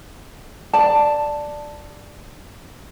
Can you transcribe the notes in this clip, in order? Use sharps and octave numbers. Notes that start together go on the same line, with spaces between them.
D5 A5